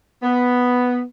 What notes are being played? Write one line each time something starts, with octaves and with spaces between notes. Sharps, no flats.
B3